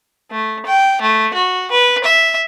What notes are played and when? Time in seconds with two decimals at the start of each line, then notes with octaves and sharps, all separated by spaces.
0.31 A3
0.66 G5
1.02 A3
1.33 F#4
1.71 B4
2.04 E5